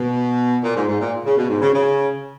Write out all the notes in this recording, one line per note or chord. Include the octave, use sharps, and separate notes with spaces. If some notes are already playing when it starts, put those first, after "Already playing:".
Already playing: B2
A#2
G#2
G#2
A#2
C#3
B2
G#2
C#3
C#3